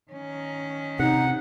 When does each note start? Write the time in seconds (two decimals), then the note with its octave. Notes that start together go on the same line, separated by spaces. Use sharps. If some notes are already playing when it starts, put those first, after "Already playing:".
0.12 D#3 C#4
0.99 C3 D#4 F#5